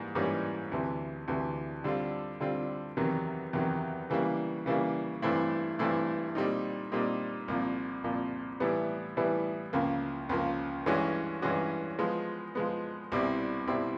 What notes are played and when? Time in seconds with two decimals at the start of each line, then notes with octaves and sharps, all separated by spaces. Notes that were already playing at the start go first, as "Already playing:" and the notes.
Already playing: G#2 E3 G3 A#3
0.15 G#2 E3 G3 A#3 C#4
0.72 D2 C3 E3
1.28 D2 C3 E3
1.84 D3 G3 C4 F4
2.40 D3 G3 C4 F4
2.97 E2 C3 D#3 F#3
3.53 E2 C3 D#3 F#3
4.10 C#3 E3 G3 A#3
4.66 C#3 E3 G3 A#3
5.22 G2 E3 A3 C4 E4
5.79 G2 E3 A3 C4 E4
6.35 A#2 G3 C4 D#4
6.92 A#2 G3 C4 D#4
7.48 C2 A#2 F3
8.04 C2 A#2 F3
8.60 A2 E3 G3 B3
9.17 A2 E3 G3 B3
9.73 C#2 C#3 F3 A#3
10.29 C#2 C#3 F3 A#3
10.86 G2 E3 G#3 C#4 F#4
11.42 G2 E3 G#3 C#4 F#4
11.99 F3 G#3 B3
12.55 F3 G#3 B3
13.12 C2 B2 G3 C4 E4
13.68 C2 B2 G3 C4 E4